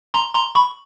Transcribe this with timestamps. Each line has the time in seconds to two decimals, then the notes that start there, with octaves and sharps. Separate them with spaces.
0.14 A#5 C6
0.35 A#5 C6
0.55 B5 C#6